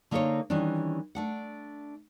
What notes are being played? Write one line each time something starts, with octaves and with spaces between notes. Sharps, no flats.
D3 A#3 D#4 A4 C5 C#5
D#3 E3 G3 C#4 D4
A3 D4 F#5